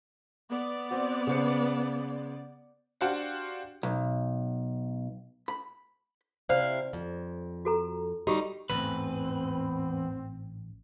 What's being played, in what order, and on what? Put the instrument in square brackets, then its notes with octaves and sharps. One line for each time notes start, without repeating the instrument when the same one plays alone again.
[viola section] B3 D5
[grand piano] C4 F#4
C#3 C5 C#7
[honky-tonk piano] D4 F#4 G4 C5 F5 F#5
[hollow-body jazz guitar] B1
B5
[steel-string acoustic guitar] C3 E4 F5 [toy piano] C5 D5
[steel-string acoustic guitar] F2
[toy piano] F#4 A4 A#5
[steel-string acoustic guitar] G3 D#4 [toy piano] F#4 G4 C#6
[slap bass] A1 G#2 [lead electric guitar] E2 B4 [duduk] C4